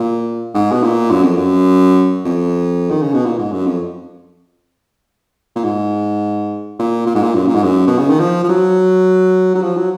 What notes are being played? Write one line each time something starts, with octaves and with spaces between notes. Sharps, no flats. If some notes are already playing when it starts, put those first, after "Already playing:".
Already playing: A#2
G#2
B2
A#2
F#2
F2
F#2
F2
D#3
C#3
B2
A#2
G#2
F#2
F2
A#2
G#2
A#2
A#2
G#2
A#2
F#2
A#2
G#2
F#2
B2
C#3
D#3
F3
F3
F#3
F#3
F3
F#3